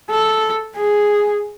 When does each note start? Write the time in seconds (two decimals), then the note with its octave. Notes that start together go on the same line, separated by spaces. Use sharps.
0.11 A4
0.76 G#4